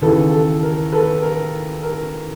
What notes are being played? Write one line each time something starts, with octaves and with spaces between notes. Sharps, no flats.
D#2 C#3 E3 A4 B4
A4
A#4
A4 B4
A#4
A#4